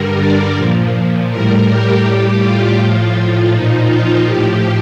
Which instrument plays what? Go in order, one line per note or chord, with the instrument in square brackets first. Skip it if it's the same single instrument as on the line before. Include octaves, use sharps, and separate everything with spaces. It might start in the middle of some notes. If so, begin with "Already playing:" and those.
Already playing: [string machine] G2 D3 G3 A#4
D5
A#2 F3
A2 G3 A#4
G4
A2 G3 G4
F4
A2 F3
A#2 F3 D#4
F4
A2 F3 G4